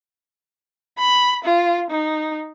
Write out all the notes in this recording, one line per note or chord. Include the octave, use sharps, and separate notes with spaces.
B5
F4
D#4